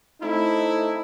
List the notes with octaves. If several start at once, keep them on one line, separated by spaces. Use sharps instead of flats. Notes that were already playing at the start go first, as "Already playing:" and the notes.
A3 C4 D#4 E4